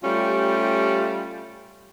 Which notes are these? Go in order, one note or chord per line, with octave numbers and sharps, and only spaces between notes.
G3 A3 C#4 F4 G4